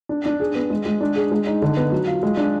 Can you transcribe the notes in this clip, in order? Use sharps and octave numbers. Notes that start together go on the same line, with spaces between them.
D4
D4
G#4
B3
G#3
G#3
D4
G#4
G#3
D#4
D3
B3
F#3
F4
G#3
D4